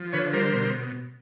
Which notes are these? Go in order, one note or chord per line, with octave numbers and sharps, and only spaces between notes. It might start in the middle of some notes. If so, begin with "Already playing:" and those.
Already playing: F3
D3 B4 C#5
G3 A#4 C5
B2